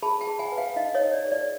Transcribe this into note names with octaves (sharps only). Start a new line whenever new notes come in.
G#4 A5 B5
G5 A5
G#4
F#5 G#5
B4
F5 G5
D#4 D#5 F5
C#5 D#5
D#4
D5
G#4
D5